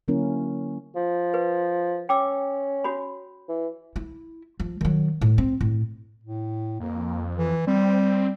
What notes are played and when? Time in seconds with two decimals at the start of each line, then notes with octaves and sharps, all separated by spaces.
0.08 D3 F#3 A#3 C#4 E4 A#4
0.96 F3
1.34 B4
2.09 C#4 G5 D6 E6
2.84 F#4 C#5 B5
3.48 E3
3.96 E4
4.60 F3
4.81 D#3 F#3
5.21 A2
5.38 C4
5.61 A2
6.24 A2
6.80 F2 A#3
7.38 E3
7.67 G3 C4